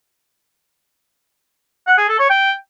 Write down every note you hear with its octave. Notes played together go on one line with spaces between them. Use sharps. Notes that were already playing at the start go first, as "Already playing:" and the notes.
F#5
G#4
A4
C#5
G5